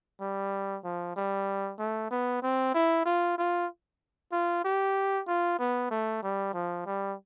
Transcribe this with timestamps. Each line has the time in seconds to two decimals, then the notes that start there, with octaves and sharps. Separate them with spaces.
0.21 G3
0.84 F3
1.16 G3
1.78 A3
2.11 B3
2.42 C4
2.74 E4
3.05 F4
3.38 F4
4.32 F4
4.64 G4
5.27 F4
5.59 B3
5.90 A3
6.23 G3
6.53 F3
6.86 G3